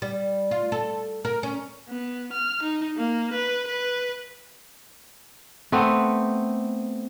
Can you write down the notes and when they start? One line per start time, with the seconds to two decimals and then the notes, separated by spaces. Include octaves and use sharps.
0.02 G3
0.51 F4
0.72 A4
1.25 A#4
1.43 C#4
1.89 B3
2.33 F6
2.63 D#4
2.97 A#3
3.34 B4
3.68 B4
5.72 A3 B3 C4